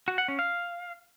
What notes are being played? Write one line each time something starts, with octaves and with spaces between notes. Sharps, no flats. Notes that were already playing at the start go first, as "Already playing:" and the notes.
F#4
F#5
C#4
F5